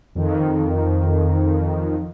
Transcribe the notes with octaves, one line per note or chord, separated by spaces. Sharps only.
F2 D#3